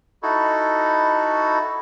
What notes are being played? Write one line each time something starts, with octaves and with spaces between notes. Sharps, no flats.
D#4 E4 F#4 A4